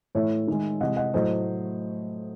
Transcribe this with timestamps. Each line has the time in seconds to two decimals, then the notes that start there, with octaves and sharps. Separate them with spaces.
0.15 A2 E3 A3 C#5 E5
0.48 D#3 G#3
0.80 C3 E3 G#3 D#5 F#5
0.96 D#5 F#5
1.14 A2 F#3 A3 C5 D#5